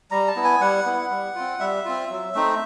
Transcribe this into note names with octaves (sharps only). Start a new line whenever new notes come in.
G3 A#5
A5
B3 E4
G#5
G3 F#5
B3 E4
G3
C4 F4
G3 E5
C4 F4
F#3
A3 C4 D#4